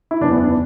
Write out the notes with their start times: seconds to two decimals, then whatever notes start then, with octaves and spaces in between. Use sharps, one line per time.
0.11 E4
0.21 F#1 E2 E3 D4
0.32 B3
0.43 D4